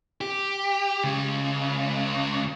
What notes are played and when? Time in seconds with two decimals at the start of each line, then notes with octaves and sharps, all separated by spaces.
0.21 G4
1.04 C#2 C#3